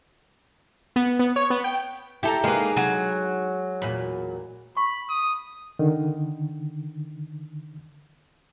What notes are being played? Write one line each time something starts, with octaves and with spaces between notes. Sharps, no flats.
B3
B3
C#5
B3
G5
E4 G4 A4 G5 A#5
G#3 A#3 D#4 B4
F#3
E2 A#2 B5
B5 C#6
D#6
D3 D#3